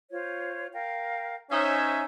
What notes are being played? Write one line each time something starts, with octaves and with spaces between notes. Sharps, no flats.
F4 C5 C#5
A#4 F5 G5
C#4 D#4 C5 C#5 E5 G#5